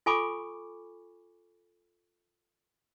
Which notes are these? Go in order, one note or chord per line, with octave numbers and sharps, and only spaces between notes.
F4 A4 G#5 B5 C#6 D6